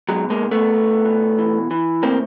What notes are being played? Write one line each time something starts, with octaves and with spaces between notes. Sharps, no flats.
B2 F#3 G#3
G#3 A#3
B2
A3 B3
B2
B2
E3
E3
A2 A#3 C4